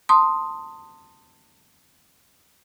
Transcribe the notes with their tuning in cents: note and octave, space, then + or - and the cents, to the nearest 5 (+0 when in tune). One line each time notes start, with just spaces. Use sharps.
A5 +25 C6 +0 D#6 +0